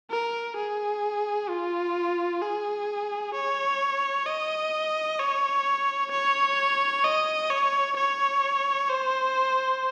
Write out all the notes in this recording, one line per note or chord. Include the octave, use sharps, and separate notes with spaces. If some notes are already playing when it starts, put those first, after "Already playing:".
A#4
G#4
F4
G#4
C#5
D#5
C#5
C#5
D#5
C#5
C#5
C5